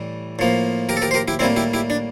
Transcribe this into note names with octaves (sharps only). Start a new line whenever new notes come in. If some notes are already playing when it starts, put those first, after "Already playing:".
Already playing: A2 E3 G3
A2 F3 A#3
G4 A#4
A4
G4 A#4
C5
G4 A#4
E4 G4
A2 G3 A#3 C4 E4
E4 G4
E4 G4
D4